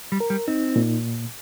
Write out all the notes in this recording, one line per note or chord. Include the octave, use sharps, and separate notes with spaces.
G3
A#4
G3
C4 D#4
A#2